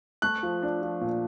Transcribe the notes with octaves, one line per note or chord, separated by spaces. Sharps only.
A3 F#6
F3
D4
F3
A#2